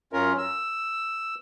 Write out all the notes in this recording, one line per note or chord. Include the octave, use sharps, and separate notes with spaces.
F#2 C#4 F4 A#4
E6